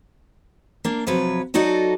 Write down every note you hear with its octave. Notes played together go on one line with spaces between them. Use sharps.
A#3 D4
C3 F3 F#3 B4
F#3 D#4 F#4 A4 D5 D#5